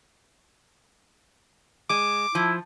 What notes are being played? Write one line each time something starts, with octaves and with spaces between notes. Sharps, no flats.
G#3 D6
F3 E4